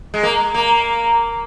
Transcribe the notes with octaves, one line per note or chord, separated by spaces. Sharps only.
G#3
A#3
A#3